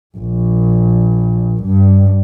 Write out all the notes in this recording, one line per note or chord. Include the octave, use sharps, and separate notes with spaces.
A#1
G2